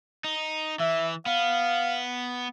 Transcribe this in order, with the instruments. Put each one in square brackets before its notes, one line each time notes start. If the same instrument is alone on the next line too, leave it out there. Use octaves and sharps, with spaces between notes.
[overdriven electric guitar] D#4
[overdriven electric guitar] E3 [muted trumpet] E5
[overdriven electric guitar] B3 [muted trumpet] F5